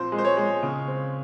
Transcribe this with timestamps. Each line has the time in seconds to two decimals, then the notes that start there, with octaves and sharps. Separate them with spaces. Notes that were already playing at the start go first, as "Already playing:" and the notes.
Already playing: A#2 F3 C4 C5
0.12 G#3
0.18 C5
0.24 C#5
0.37 G#3
0.63 C#3
0.88 C4